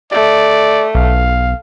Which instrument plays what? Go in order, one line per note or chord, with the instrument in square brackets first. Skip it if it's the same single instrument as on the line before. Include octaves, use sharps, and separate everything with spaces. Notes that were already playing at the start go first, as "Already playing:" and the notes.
[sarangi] A3 [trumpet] D5
[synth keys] B1 [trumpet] F5